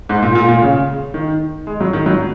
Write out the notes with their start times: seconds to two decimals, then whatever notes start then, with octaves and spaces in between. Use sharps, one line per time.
0.09 G#2
0.22 A#2
0.35 A#2
0.49 A#2
0.62 C#3
1.14 D#3
1.67 G#3
1.81 F#3
1.93 D#3
2.06 F#3